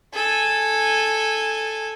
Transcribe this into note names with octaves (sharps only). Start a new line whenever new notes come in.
A4 G#5